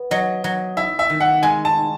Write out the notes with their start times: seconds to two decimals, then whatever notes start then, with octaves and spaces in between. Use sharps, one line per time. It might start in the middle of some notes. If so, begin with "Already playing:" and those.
Already playing: B3
0.11 F#3 D#5
0.44 F#3
0.77 E4 E5
0.99 E5
1.10 D#3
1.20 F#5
1.43 G#3 G#5
1.65 A5